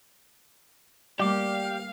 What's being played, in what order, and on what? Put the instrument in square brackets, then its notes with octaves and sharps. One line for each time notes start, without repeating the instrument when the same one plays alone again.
[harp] G3 A#3 [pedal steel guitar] G4 D6 [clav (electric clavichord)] D5 [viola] F5